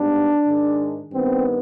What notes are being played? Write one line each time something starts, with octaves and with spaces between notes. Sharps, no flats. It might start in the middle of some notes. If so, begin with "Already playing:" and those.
Already playing: G#2 G3 B3 D4
G#2 D#3 G#3
G2 D#3 B3 C4